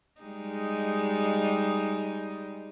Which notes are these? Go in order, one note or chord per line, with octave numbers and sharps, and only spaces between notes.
G3 G#3 D#4